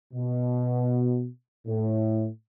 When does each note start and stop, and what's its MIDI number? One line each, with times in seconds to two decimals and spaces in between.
0.13 1.27 47
1.66 2.27 45